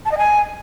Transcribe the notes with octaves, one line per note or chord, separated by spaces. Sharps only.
A5
D#5
G#5